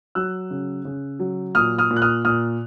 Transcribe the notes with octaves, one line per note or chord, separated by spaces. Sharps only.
F#3 E6 F#6
C#3
C#3
F#3
A#2 D#6 F6
D#6 F6
A#2
F#6
D#6 F6
A#2 D#6 F6